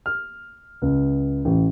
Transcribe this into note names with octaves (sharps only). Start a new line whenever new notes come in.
F6
C#2
A1